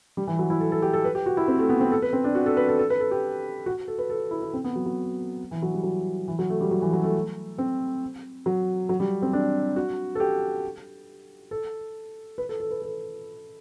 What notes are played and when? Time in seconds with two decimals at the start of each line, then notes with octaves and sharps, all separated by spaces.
0.17 G3
0.27 E3
0.39 F#3
0.50 E4
0.60 A4
0.72 A4
0.82 G4
0.93 A4
1.04 B4
1.15 G4
1.26 F#4
1.37 E4
1.48 C4
1.59 A3
1.69 B3
1.81 C4
1.92 A4
2.02 B4
2.13 C4
2.24 D4
2.35 F#4
2.46 A4
2.57 B4
2.68 A4
2.79 A4
2.90 B4
3.00 A4
3.11 G4
3.66 F#4
3.88 A4
3.98 B4
4.10 A4
4.31 E4
4.42 E4
4.53 C4
4.64 B3
4.75 F#3
4.86 F#3
5.51 E3
5.62 F#3
5.73 G3
5.83 F#3
6.28 E3
6.39 F#3
6.50 A3
6.61 G3
6.71 F#3
6.82 E3
6.93 F#3
7.04 A3
7.58 C4
8.46 F#3
8.89 F#3
9.00 G3
9.22 C4
9.33 D4
9.76 F#4
10.15 A4
10.20 G4
11.51 A4
12.38 B4
12.49 A4
12.60 A4
12.71 B4
12.82 A4